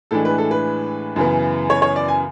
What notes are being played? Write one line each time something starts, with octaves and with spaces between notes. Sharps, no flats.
A2 E3 G#3 D4 A4
B4
A4
B4
F#2 C#3 E3 B3
C#5
C#5
D5
G#5